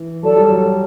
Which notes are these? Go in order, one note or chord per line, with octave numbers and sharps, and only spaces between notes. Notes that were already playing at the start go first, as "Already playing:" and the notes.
Already playing: E3
F#3 A4 D5 A5
G3
F#3